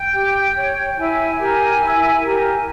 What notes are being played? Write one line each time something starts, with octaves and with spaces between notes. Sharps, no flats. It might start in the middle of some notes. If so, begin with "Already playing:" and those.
Already playing: G5
G4
C#5
E4 G#5
G4 A#4
E4
G4 A#4